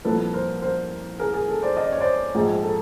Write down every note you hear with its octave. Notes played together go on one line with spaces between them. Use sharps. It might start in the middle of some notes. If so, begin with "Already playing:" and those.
C2 A#2 F3 A4 B4
A#4 C5
A#4 C5
G#4 A#4
G#4
A4
C5 D5
D#5
D5
C#5
C5 D5
A#1 G#2 F3 G#4
A4